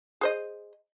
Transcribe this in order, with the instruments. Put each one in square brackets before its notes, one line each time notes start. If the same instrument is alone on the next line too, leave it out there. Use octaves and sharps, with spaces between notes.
[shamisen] G#4 C5 D#5